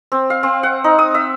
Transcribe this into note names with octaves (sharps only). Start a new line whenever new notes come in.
C4
F5
C4
F#5
D#4
D#6
E5